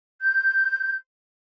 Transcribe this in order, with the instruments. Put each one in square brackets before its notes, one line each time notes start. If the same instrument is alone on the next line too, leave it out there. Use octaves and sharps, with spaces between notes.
[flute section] G6